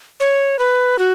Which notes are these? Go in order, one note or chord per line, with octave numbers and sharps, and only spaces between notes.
C#5
B4
F#4